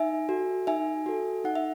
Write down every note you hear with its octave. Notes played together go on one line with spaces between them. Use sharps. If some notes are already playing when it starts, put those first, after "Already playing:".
Already playing: D#4 E5 G#5
F#4 A4
D#4 E5 G#5
F#4 A4
D#4 F#5
E5